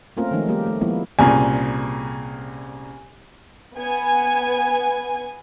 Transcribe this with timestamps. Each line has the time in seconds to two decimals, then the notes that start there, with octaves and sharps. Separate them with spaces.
0.17 A3 A#3 C4 C#4 F4 A#4
0.31 D#3 F3 G#3 A3 C#4 D#4
0.48 G3 A3 A#3 G4 A#4
0.66 A3
0.81 F3 G#3 A#3 B3 E4
1.19 C2 A#2 C#3 G#5
3.75 B3 G#5